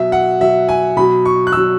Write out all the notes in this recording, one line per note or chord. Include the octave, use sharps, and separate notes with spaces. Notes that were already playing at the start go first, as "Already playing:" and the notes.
Already playing: B2 F#3 E5
F#5
B2 F#3 E5
G#5
B2 F#3 B5
C#6
F#6
B2 F#3 E6